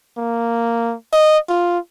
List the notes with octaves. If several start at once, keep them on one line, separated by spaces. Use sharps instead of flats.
A#3
D#5
F4